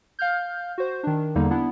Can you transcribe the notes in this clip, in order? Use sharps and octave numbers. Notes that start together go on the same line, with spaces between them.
F5 F6 G6
F#4 C5
D#3 D4
E2 D3 G3 A#3 D#4
B3 D4 E4